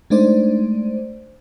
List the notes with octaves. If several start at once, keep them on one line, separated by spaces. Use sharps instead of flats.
G#3 A3 D4 D#4 C5 D5